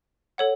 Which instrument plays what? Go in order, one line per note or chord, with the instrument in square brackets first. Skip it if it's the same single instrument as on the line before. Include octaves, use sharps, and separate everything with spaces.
[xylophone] A4 C#5 F#5